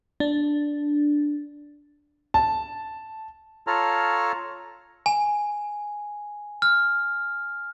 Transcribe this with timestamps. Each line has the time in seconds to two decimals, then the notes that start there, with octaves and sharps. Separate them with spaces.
0.20 D4
2.34 A5
3.67 F4 A4 C#5 A5 A#5 F6
5.06 G#5
6.62 F6